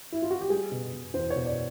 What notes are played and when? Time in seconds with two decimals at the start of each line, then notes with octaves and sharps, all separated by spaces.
0.12 E4
0.22 F4
0.30 F#4
0.41 G4
0.50 G3 G#4
0.71 B2
0.93 B2
1.14 E2 C5
1.30 C#5
1.36 B2
1.46 D5